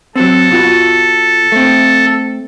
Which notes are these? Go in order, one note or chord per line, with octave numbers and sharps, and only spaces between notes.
F#3 C4 A4
B2 F4 F#4
A3 C4